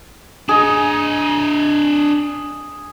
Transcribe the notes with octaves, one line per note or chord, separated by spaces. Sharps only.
D4 G#4 D#5